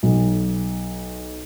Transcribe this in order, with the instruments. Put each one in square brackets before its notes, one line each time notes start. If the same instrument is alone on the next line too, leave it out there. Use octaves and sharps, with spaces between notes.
[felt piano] B1